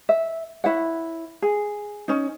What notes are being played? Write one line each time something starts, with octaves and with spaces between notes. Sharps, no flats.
E5
E4 C#5 F#5
G#4
C#4 D#4